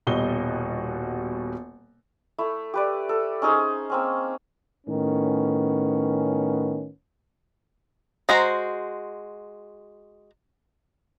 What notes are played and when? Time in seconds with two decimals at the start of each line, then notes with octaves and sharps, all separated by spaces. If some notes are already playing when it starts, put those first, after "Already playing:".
0.07 D#1 B2 G3 F#4 D#5 G7
2.38 A3 E4
2.74 G4 B4 D5
3.09 A4
3.42 C#4 D#4 G#4 C5
3.90 A#3 C4 C#4
4.87 A2 D#3 B3 C#4
8.29 G#3 F#4 C5 A#5